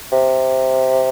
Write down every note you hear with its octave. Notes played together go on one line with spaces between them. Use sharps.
C3